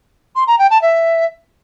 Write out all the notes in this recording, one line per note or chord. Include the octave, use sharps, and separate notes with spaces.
C6
A#5
G5
A5
E5